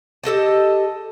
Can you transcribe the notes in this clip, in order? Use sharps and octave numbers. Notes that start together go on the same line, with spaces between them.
G4 A4 D#5 A5